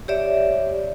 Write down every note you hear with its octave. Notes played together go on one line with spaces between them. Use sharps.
G4 C#5 D5 E5